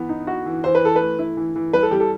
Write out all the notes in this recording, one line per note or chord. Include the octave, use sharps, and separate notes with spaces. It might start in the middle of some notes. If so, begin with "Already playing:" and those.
Already playing: E3 B3
D#4
F#4
E3
E3 C5
B4
E3 A4
A3 B4
E4
E3
E3
G3 B4
A4
G3 G4
A4